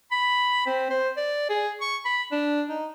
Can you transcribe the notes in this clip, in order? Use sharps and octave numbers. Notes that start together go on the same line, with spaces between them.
B5
C4
C5
D5
G#4
C#6
B5
D4
D#4